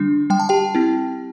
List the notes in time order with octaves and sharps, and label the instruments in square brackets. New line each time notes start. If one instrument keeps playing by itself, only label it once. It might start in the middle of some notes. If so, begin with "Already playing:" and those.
Already playing: [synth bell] D3 G3 D4
G3 G5
A5
G4 G5
C4 E4